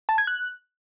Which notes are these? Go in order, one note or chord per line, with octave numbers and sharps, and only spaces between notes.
A5
G#6
F#6